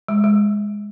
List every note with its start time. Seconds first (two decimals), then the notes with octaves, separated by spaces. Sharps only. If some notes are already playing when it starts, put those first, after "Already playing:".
0.08 G#3
0.24 G#3